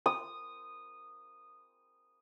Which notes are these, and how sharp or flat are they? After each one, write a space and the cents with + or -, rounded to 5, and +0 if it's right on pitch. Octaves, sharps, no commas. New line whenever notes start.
D#6 -10